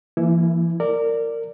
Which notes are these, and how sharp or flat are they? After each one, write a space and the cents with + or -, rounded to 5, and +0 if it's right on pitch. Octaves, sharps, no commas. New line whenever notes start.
E3 +40 A#3 +0 E4 +0
A#4 -20 D5 +0